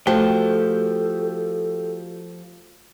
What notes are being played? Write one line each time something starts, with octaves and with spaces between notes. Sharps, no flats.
F3 A3 F#4 G4 A4 G5